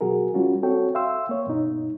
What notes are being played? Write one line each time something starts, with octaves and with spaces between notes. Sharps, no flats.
B2 F#3 F#4 G#4 A#4
G3 C#4 F4 F#4
C4 F#4 A4 C#5 G5
E5 F5 G5 C6 E6
A#3 C#5
G2 B2 D#4